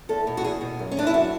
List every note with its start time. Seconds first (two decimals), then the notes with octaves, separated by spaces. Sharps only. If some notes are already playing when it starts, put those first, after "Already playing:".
0.09 E2 A4
0.27 B2
0.37 F#4
0.44 E2 G#4
0.61 B2
0.79 F#2
0.91 C#4
0.97 E3 D4
1.07 E4
1.13 F#2 F#4